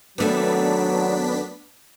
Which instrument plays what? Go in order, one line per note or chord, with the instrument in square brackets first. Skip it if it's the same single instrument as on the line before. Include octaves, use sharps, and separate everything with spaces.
[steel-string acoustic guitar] D#2 A3 C4 [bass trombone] F#3 [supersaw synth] B3 D4 B6